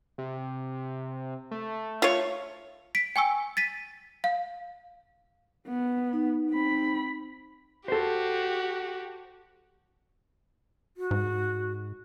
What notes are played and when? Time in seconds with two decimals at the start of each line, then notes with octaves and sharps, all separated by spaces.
0.18 C3
1.51 A3
2.02 F4 C#5
2.95 B6 D7
3.16 G5 G#5 C#6 E6
3.57 A6 B6 D#7
4.24 F5
5.68 B3
6.13 D#4
6.50 C4 B5
7.88 F#4 G4 A4 C5
10.97 F#4
11.11 G#2